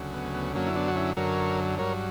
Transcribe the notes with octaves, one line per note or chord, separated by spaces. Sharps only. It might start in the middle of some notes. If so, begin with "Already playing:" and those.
Already playing: D2 C#3 F#3
B3
B3
F#2 D3 F#3 A#3 C#4
E4
B3 D4
F#4
C#4 E4
F#2 D3 F#3 A#4 C#5
G2 F#3 A#4 C#5